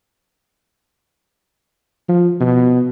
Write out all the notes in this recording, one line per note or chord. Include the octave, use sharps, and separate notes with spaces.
F3
B2